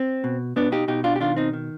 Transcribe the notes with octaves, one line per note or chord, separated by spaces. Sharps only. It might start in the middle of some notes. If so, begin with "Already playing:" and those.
Already playing: C4
B2
B2 B3 D4
D#4 G4
B2 D#4 G4
D4 F4
G4
D#3 D4 F4
C4 D#4
D#3